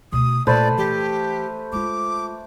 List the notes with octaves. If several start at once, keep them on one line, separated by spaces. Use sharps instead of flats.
D2 B2 D#6
A#2 A3 C#4 B4 C5 D5
E3 G4
G#3 F4 D6